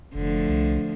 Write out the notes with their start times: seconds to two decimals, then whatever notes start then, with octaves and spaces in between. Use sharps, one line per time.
0.14 F1 D3 F3 A3
0.49 C2